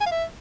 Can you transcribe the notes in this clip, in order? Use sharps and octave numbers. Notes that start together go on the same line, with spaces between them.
G#5
F5
E5